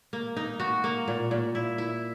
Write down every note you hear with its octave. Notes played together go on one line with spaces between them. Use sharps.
A#3
D#4
F#4
A#3
A#2
A#2
E4
E4